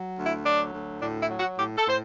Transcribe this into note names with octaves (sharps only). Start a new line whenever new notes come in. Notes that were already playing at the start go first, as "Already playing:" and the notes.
Already playing: F#3
D2
E4
F#3 D4
D2
A2 D4
E4
F#3
F#4
A2 G4
A4
A2 C5